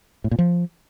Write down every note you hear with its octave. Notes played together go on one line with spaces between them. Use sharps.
A2
A#2
F3